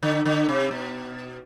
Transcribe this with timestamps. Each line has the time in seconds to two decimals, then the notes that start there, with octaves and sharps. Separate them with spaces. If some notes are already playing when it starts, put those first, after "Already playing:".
0.03 D3
0.26 D3
0.49 C3
0.71 B2